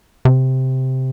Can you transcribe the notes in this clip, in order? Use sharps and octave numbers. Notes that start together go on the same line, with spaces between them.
C3